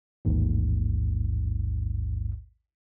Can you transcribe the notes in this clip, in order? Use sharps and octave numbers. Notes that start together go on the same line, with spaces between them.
A1 D#2 G#2